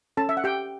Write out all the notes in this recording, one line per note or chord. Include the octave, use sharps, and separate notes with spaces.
C#4 A4 A5
E5
F#5
G4 G5